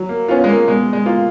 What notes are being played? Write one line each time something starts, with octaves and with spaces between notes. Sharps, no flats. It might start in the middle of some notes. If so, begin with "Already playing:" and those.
Already playing: F#3
A#3
B3 C#4 F4
G#3
A#3
B2 G#3
G#3
A#3 F4